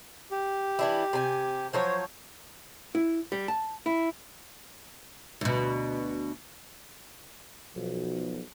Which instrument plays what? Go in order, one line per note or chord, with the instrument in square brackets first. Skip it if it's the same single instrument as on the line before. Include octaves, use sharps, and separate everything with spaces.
[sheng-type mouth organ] G4
[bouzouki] E3 D4 E4
C3 G#5
[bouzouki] F3 F#3 C#5 [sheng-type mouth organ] C5
[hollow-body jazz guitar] E4
G3
A5
E4
[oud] D2 B2
[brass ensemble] B1 F3